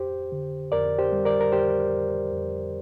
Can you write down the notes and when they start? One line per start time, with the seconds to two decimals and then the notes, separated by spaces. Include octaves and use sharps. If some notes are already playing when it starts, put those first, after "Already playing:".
Already playing: F2 G4 C5
0.32 D3
0.72 F2 A#4 D5
0.98 G4 C5
1.12 G3
1.25 A#4 D5
1.40 A#4
1.52 F2 G4 C5
1.92 F2
2.32 F2